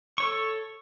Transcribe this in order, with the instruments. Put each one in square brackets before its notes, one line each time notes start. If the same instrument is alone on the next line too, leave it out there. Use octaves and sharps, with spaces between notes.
[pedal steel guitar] A4 C#5 C#6